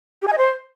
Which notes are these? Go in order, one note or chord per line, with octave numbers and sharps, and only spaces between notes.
G4
G#5
D#5
C5